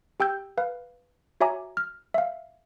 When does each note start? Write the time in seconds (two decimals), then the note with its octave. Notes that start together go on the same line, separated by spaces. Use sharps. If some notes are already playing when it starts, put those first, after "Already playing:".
0.20 G4 G5 E6 G6
0.58 B4 F5
1.41 F#4 C#5 E5 G#5 A#5 D6
1.77 F6
2.14 E5 F5